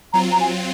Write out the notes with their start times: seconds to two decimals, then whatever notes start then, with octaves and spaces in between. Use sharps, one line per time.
0.13 F#3 C4 F4 A#5
0.32 A#5
0.41 G#5